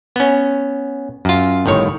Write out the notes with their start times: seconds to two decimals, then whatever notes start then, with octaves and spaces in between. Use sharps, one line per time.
0.16 B3 C#4
1.25 F#2 F4
1.66 G1 A2 D#3 C#5